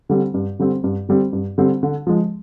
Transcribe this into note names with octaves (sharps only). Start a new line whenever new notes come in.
D3 G3 C4
G2
D3 G3 C4
G2
D3 G3 C4
G2
D3 G3 C4
D3
F3 G#3